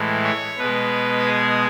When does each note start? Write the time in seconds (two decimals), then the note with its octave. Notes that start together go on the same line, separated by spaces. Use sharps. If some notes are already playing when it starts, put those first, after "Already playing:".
Already playing: A2 E3 G#3
0.24 C#5
0.58 B2 G#3 B4
1.26 G#4